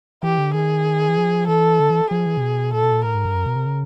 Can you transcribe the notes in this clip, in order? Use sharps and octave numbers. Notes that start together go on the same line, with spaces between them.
E3 G4
D3
D#3 G#4
E3
F3
E3 A4
D3
E3
F3 G#4
E3
C3
B2
A#2 A4
B2
A#2
A2 A#4
G#2
G2
F#2
B2
C3
C#3